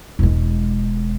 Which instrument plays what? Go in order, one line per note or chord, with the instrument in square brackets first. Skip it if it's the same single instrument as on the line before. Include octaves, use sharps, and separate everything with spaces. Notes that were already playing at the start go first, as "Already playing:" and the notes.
[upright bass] E1 G#3